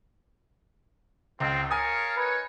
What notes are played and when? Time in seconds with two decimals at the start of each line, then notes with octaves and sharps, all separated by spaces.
1.40 C#2 C4 F4
1.71 A#4 C#5 F5 G#5 A5 D#6
2.17 D#4 B4 C#5